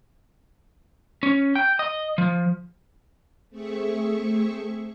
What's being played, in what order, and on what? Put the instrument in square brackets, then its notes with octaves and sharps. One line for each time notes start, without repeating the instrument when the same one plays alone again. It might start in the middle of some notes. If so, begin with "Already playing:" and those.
[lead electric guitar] C#4
G5
D#5
F3
[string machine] A3 C4 G#4 E5 C#6